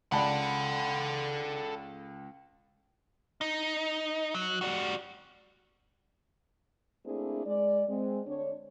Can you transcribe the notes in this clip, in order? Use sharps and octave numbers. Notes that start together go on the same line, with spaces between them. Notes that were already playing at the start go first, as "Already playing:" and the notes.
C#2 A4 D5 F#5 A5 B5
D#4
F#3
G3 F#4
A3 A#3 C4 D4 E4 G#4
G#3 D5
G#3 C4
D2 D4 C#5